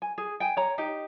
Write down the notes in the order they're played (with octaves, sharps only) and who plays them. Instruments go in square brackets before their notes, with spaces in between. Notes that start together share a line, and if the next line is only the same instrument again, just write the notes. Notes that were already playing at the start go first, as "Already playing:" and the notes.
[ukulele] G#5
G#4
G5 G#5
C#5 A#5
D#4 G4